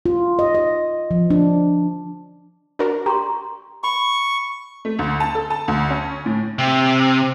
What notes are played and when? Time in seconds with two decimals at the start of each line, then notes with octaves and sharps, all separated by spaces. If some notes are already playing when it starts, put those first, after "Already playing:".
0.06 F4
0.39 D#5
0.55 D#5
1.11 F3
1.30 D4
2.79 D4 F#4 A#4
3.06 G4 A#5 C6 C#6
3.84 B5 C#6
4.85 A3
4.99 D2
5.20 A5
5.35 A4
5.50 A5
5.68 D2
5.90 C#4
6.26 A2
6.59 C3